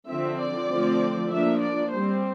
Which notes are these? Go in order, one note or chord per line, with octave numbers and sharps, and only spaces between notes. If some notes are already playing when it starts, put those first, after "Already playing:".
D3 F3 C4 E5
D5
D3 F3 A3 C4
F3 A#3 D4 E5
D5
G3 C4 C5